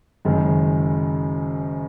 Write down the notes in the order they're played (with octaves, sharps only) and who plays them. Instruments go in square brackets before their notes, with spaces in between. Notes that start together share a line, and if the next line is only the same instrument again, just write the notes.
[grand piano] F#1 F#2 D#3 G#3